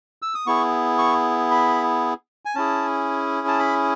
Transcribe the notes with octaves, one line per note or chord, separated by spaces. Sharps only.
E6
D#6
B3 E4 G#4 C#6
C#6
B5
G#5
C#4 E4 G#4 A5
A5
B5